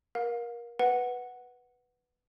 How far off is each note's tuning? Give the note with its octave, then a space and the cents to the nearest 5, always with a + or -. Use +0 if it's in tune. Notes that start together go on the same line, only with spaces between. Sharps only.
A#4 +25 F5 +35
B4 +0 F#5 +0